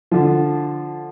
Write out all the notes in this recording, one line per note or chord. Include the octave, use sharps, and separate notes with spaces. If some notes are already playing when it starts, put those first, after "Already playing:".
D3 F3